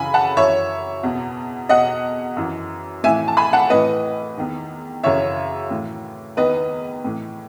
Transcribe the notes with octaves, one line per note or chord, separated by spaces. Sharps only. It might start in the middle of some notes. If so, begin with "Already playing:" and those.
Already playing: F#2 C#3 E3 G#5 B5
F#5 A5
F#2 E3 C#5 E5
E2 B2
E2 B2 D#5 F#5
F#2 E3
A2 E3 E5 G#5
A5
G#5 B5
F#5 A5
A2 E3 B4 D#5
E2 D#3
F#2 C#3 E3 C#5 E5
A2 E3
E2 D#3 B4 D#5
A2 E3